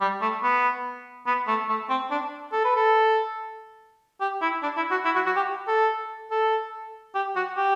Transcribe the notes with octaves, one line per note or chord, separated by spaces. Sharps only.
G3
A3
B3
B3
A3
A3
C4
D4
A4
B4
A4
G4
E4
D4
E4
F#4
E4
F#4
F#4
G4
A4
A4
G4
F#4
G4